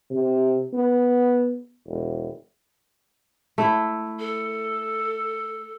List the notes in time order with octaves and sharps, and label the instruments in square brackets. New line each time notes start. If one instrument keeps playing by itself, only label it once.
[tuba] C3
B3
E1
[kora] A3 E4
[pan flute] A4